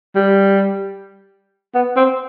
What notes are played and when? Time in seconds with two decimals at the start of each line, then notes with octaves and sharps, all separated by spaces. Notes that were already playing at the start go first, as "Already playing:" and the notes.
0.16 G3
1.75 B3
1.97 C4